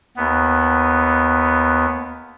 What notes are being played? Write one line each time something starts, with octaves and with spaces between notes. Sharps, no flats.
D#2 B3